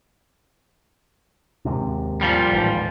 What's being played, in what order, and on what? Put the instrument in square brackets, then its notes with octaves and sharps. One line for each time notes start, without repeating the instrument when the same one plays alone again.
[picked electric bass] D#2 G#2 C3
[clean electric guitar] A#2 F3 G3
[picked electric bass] A1 D#2 G#2